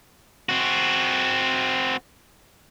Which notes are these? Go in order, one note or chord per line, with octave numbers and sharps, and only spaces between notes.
C4 F#4